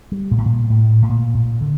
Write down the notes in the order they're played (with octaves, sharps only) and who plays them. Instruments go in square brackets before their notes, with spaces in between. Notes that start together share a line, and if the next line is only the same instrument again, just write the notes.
[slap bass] G3
A#2
A2
A#2
A2
A2
A#2
A#2
D3